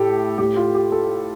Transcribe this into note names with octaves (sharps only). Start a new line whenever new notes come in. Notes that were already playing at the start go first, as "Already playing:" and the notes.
Already playing: A2 G4 A4
A2 G4
F4
G4
A4